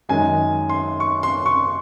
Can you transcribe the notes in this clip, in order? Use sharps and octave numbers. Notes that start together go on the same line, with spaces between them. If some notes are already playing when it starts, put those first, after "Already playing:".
F#2 D#3 G#3 D#4 G#5
C6
C#6
C6
C#6